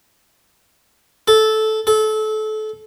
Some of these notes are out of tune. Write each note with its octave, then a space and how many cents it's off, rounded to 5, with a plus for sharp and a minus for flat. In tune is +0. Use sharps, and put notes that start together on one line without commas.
A4 -10
A4 -25